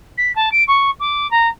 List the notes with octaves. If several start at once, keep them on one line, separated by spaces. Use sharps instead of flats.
B6
A5
D7
C#6
D6
A#5